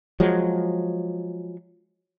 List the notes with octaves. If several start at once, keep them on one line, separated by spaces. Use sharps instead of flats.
F3 F#3 G#3